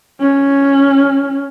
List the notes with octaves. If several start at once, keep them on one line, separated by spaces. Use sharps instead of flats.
C#4